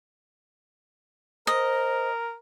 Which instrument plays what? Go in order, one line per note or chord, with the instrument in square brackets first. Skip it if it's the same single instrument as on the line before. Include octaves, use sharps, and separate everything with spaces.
[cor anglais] A#4 [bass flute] C5 [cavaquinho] D#5